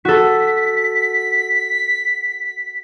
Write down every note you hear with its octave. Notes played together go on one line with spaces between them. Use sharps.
F#4 A4 B6